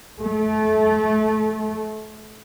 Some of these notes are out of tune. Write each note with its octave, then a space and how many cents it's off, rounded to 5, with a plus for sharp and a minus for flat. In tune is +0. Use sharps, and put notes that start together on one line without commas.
A3 -25